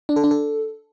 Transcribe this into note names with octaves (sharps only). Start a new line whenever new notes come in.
D4
A4
D4
A4